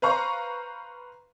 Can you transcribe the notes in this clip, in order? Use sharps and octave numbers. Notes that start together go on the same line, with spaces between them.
B4 C5 F5 A#5 C#6